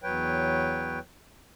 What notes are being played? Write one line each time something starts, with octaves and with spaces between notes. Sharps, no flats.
E2 F#3 B4 C#5 G5